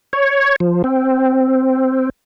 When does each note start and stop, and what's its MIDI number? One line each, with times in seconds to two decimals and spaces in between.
0.13 0.56 73
0.60 0.82 53
0.84 2.10 60